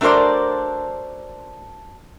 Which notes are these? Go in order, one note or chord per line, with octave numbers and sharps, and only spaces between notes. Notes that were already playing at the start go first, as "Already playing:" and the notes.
A3 D4 F#4 A#4 C5 D5